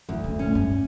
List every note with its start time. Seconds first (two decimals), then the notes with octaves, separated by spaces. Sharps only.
0.09 D2 E3
0.24 C#3
0.39 A2 C#4
0.55 G2